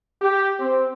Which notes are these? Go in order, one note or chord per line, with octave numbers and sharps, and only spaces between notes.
G4
C4